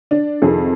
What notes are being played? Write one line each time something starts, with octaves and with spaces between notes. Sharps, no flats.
D4
F2 C3 D#3 G#4